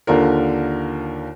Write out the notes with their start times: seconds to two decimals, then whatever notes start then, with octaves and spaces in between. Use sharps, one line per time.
0.07 D#2 D3 D4 F4 A#4